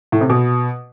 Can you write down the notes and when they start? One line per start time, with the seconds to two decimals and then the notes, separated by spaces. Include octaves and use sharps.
0.12 A2
0.21 C3
0.30 B2